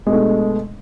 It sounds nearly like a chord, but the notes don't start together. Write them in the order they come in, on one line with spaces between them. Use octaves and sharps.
G#3 B2 A3 D4